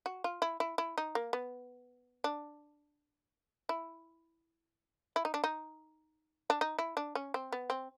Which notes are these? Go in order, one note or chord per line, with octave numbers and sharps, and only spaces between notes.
F#4
F4
E4
E4
E4
D#4
A#3
B3
D4
E4
E4
D#4
D4
D#4
D4
D#4
E4
D4
C#4
C4
B3
C4